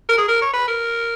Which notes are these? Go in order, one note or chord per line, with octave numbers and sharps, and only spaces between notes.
A#4
G#4
A#4
C#5
B4
A#4